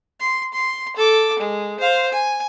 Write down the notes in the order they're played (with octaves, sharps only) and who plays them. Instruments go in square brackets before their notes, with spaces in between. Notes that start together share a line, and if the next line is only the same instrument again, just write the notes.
[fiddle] C6
C6
A4 D6
G#3
C5 F5
G#5